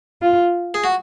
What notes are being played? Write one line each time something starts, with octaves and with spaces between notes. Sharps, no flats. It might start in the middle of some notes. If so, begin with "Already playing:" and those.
F4
G#4
F#4